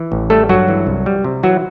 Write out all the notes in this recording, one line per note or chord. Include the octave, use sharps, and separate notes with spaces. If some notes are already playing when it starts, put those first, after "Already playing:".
Already playing: E3
A1
G3 A3 A4
G2 F#3 F#4
E3
C2
G3
C3
E3 F#3 F#4